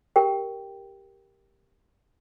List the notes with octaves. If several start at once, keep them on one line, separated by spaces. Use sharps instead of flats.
G4 A#4 G5